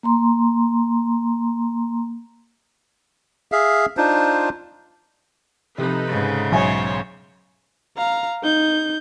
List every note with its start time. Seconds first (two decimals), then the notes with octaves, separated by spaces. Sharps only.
0.03 A#3 A#5 C6
3.52 G#4 E5 F5
3.97 D4 D#4 F4 C5
5.78 C3 F3 D#4 A4 B4
6.07 G#2 C#3
6.52 B1 C5 C#5 E5 G#5
7.98 F5 A#5
8.43 D#4 G6